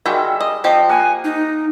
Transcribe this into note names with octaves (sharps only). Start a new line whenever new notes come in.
D#3 G3 G#3 F#4 E5 G5
D#5
F3 C4 G4 D#5
A#3 F#5 G#5
D#4